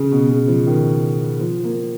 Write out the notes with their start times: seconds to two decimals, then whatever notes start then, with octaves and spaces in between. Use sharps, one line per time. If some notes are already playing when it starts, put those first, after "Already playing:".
Already playing: C#3
0.11 B2
0.30 C#3
0.48 F3
0.67 D#3
1.40 F3
1.64 A#3